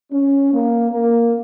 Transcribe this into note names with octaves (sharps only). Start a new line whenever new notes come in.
C#4
A#3
A#3